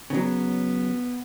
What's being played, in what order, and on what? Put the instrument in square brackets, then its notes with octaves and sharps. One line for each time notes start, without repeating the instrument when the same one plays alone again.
[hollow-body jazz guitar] C#3 F#3 [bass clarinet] B3